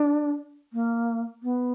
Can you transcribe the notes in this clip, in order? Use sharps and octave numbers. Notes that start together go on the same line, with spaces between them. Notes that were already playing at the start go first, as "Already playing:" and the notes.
Already playing: D4
A#3
B3